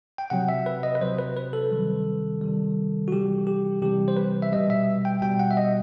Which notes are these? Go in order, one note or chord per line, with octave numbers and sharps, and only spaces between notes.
G5
C3 F#3 F#5
E5
B4
D#5
B4
C3 F#3 C5
B4
B4
A4
C3 D#3 G3
C3 D#3 G3
F#4
C3 E3 G3 G4
G4
C3 E3 G3 G4
C5
B4
E5
B2 G3 D#5
E5
G5
B2 G3 G5
F#5
E5
D#5